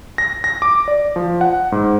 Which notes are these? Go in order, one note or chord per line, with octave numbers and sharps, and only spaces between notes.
A#6
A#6
D6
D5
F3
F#5
G#2